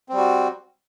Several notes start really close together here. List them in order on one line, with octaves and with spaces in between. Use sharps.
C4 G3 F#4